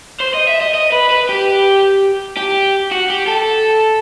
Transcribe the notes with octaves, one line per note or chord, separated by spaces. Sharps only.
C5
D#5
E5
D#5
D#5
B4
B4
G4
G4
F#4
G4
A4